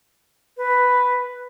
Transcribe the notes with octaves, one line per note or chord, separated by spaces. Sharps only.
B4